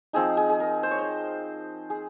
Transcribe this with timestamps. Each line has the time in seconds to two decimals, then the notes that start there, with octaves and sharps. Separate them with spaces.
0.13 F3 C4 D#4 G#4
0.37 G#4
0.49 G#4
0.60 A#4
0.83 C5
0.91 C#5
0.98 C5
1.90 G#4